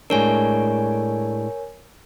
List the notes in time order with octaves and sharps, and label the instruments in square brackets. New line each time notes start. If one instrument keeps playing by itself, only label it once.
[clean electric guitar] A2 G#3 D4 [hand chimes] A#4 C#5 G#5